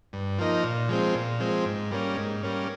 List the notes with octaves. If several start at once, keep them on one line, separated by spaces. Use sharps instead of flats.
G2
F3 A#3 D#4
A#2
F3 G#3 C4
A#2
F3 G#3 C4
G#2
G3 A#3 C#4
G#2
G3 A#3 C#4